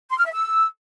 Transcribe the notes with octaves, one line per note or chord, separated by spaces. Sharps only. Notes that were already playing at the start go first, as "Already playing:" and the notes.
C6
F6
E5
E6